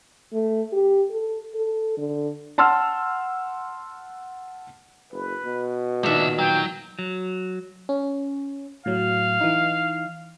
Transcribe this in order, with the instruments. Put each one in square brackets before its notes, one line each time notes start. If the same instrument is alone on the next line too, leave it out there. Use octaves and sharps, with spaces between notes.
[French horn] A3
G4
A4
A4
D3
[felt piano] F#5 A5 C6 E6 F6
[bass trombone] F#1 [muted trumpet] B4
[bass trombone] B2
[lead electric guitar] C2 E5 [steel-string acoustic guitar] A#2 D#3 [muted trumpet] D4
[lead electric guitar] F#3 [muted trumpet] G5
[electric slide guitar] F#3
[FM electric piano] C#4
[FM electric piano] A2 F#3 [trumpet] F5
[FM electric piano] E3 D#4